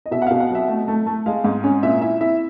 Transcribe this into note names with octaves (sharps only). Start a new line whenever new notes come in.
D#5
B2 E5
F#5
B2 F5
F#5
F#3 E5
A3
A3
A3
G#3 F5
G#2
C#4
A#2 E5
E4 E5
E4 E5